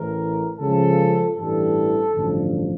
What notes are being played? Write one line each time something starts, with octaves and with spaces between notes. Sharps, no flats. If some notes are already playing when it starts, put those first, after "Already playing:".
Already playing: A1 A2 E3 A#4
C#2 C#3 F3 A4
A1 G2 E3 A4
A1 G2 D3 F3